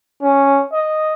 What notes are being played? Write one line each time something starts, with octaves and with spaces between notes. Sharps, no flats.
C#4
D#5